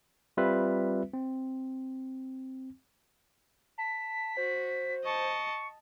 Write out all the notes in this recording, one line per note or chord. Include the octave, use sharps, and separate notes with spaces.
G3 C4 F4 B4 E5
C4
A5 B6
F#4 C5
D#5 A5 C#6